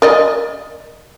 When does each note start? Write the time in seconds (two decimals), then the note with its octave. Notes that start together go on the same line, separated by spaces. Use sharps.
0.02 A#4 D5 D#5